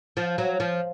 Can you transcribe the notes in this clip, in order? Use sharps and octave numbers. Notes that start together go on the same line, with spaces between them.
F3
F#3
F3